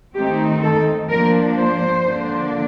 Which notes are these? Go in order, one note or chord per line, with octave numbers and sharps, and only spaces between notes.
D#3 A3 C4 D#4 G4
A4
F3 A#3 D4 A#4
C5
D3 F3 A#3 D4